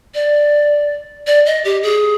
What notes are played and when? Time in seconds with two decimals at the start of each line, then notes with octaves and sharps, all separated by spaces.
0.15 D5
1.27 D5
1.46 D#5
1.65 G4
1.83 G#4